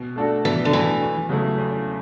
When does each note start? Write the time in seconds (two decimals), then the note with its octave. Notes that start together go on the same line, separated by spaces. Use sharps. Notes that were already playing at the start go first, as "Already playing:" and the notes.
Already playing: B2
0.16 A3 D4 F#4 A4
0.45 B2 E3
0.65 D3
0.73 E3 A3 D4 F#4 A4
1.01 E2
1.29 C#3 F#3 A3 E4
1.58 E2